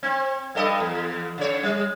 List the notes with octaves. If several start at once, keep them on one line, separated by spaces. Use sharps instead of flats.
C4
G2 A4 D#5
E2
C#3 C#5
G3